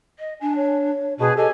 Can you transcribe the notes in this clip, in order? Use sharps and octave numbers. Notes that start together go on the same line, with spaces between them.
D#5
D4 G#5
C#5
B2 G#4 B4 A5
G4 A4 D#5 G#5